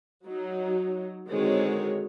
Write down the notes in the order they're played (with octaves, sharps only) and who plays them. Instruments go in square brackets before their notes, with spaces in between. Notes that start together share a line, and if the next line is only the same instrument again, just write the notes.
[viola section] F#3 D#4
D3 D#3 G#3 C4 F#4 C#5